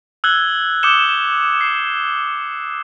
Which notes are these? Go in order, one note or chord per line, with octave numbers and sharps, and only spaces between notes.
E6 F#6 G#6 G7
D6 D#6 G6 C#7 E7 G7
C7